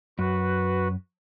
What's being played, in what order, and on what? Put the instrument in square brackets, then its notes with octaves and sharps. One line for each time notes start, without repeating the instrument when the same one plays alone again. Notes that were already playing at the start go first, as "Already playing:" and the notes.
[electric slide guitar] F#2 [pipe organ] F#4 B4